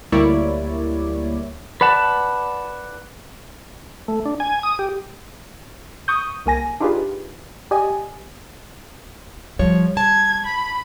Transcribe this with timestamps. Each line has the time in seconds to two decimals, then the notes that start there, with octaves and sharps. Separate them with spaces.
0.12 D2 G3 A#3 E4 C#5 D5
1.81 B4 D5 F#5 A5
4.08 A3
4.26 D4
4.40 G#5
4.63 D#6
4.79 G4
6.08 C#6 D#6 G6
6.46 C2 A#3 G#5 A#6
6.80 D4 D#4 F4 G4 G#4 B4
7.71 G4 D5 D#5 G#5
9.59 F3 G3 C#5
9.97 A5 G#6
10.45 B5